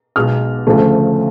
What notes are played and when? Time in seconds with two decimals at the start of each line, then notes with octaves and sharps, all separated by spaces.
0.16 B1 B2 G#3 B3 F6
0.67 D2 C#3 F3 A3